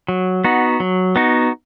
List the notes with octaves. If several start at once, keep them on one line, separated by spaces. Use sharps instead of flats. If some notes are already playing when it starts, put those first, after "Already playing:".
F#3
B3 D#4 F#4
F#3
B3 D#4 F#4